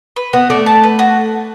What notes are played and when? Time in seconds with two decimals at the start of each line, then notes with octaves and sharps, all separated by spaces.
0.16 B4
0.33 B3 F#4
0.50 A3 D5
0.66 A5
0.84 B4
0.99 F#4